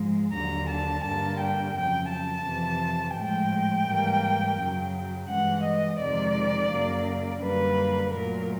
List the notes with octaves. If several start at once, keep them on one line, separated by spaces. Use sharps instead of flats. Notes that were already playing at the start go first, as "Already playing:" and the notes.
Already playing: G#2 F3 G#3
D#2 D3 F#3 A#5
A5
G2 D3 G3 A#3 A5
G5
F2 C#3 F#3 G5
A5
F2 C3 E3
A2 F3 G#3 G5
G#2 E3 G3 A#3
F#2 C#3 F#3
G2 E3 G#3 F#5
D#5
F2 C3 D#3 G#3 D5
F#2 C#3 F#3 A#3
F#2 D3 G3 A#3 B4
A#2 F#3 A3 A#4